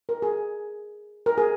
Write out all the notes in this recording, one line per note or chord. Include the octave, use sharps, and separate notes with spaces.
A#4
G#4
A#4
G#4